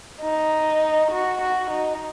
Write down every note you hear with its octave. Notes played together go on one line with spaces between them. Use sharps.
D#4
F#4
F#4
D#4